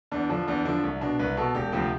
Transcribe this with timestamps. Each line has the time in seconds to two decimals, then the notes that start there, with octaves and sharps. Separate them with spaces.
0.11 E2 D4
0.30 D3 F3 D4
0.47 E2 D4
0.65 D3 F3 D4
0.83 C2
1.01 B2 D4
1.19 C2 B4
1.37 B2 A4
1.55 E1 G4
1.72 D2 C3 F3 G4